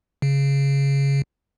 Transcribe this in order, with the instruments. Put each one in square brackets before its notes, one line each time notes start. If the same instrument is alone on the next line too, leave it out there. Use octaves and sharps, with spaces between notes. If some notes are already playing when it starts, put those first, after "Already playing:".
[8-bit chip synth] C#3